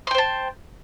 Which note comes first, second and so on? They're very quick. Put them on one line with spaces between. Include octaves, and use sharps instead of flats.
C6 G5 C5 A5